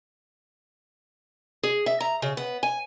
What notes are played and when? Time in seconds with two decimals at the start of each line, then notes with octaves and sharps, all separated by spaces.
1.63 G#4
1.86 E5
2.01 A#5
2.22 C#3
2.37 B3
2.63 G#5